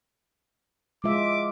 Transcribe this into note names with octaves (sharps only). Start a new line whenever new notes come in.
G#3 F4 E5 D6